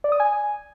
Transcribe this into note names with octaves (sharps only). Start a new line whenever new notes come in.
D5
D#6
G#5